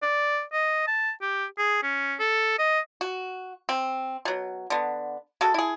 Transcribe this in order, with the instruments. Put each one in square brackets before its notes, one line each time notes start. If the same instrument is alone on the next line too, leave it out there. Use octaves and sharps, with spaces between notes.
[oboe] D5
D#5
A5
G4
G#4
C#4
A4
D#5
[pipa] F#4
C4
B2 F#3
D3 B3
G#3 F#4 A4
E4 G#4